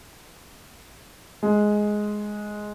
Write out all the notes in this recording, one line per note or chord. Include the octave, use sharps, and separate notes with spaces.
G#3